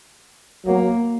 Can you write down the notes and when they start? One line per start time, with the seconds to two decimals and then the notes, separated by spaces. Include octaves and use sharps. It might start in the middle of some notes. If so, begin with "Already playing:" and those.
0.66 F#3 A#3